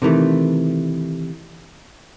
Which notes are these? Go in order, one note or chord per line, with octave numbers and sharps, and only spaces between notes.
C3 D#3 E3 A3